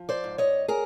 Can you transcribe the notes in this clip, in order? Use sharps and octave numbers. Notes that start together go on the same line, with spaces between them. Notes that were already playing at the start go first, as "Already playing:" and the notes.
Already playing: F3
C5 D5
G#2
C#5 D#5
G#4 A#4